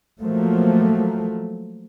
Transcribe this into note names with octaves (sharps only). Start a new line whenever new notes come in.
F3 F#3 A3 A#3